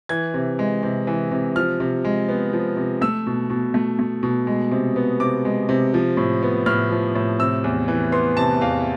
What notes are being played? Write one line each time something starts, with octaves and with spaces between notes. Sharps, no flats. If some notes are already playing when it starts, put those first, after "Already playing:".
E3 G#6
C3
G#3
C3
E3
C3
F3 F6
C3
G#3
B3
F3
C3
A3 E6
B2
B2
A3
A3
B2
G#3
C3
B3
C3 D6
G#3
C3
F3
A2
B3
A2 F6
F3
A2
C3 E6
E2
E3
B3 C6
C3 A5
E2 F5